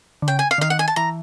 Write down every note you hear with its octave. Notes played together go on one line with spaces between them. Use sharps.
D3
C#3 G5
G#5
F5
D3
D#3 F5
F#5
G#5
A5
E3 A#5